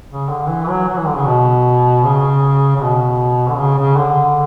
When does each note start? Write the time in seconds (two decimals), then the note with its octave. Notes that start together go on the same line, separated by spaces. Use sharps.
0.10 C#3
0.29 D3
0.48 E3
0.68 F#3
0.88 F#3
0.97 E3
1.07 D3
1.16 C#3
1.26 B2
2.04 C#3
2.76 C#3
2.81 B2
3.49 D3
3.58 C#3
3.78 C#3
3.97 D3